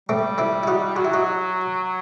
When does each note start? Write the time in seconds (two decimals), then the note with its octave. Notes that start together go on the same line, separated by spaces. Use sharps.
0.09 G3 A3 C4
0.38 C4 E4
0.63 E4
0.67 D#4 F#4
0.96 F#3 F#4
1.05 E4
1.13 D#4 F#4
1.84 F#3